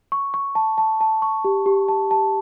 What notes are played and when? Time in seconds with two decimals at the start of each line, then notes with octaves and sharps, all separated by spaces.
0.12 C#6
0.34 C#6
0.55 A5
0.78 A5
1.01 A5
1.22 C#6
1.45 G4
1.66 G4
1.88 A5
2.11 A5